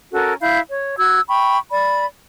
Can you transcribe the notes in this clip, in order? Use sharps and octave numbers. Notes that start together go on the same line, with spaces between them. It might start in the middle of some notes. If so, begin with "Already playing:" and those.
C#4 F#4 A4 A#4
E4 F5 G6
C#5
F#4 E6 G#6
G5 B5 C#6
D5 B5